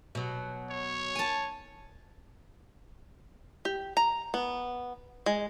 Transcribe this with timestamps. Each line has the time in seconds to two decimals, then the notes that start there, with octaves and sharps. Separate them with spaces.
0.15 B2 F#3
0.70 C#5
1.15 G#5 A5
3.65 G4
3.97 A#5
4.34 B3
5.26 G#3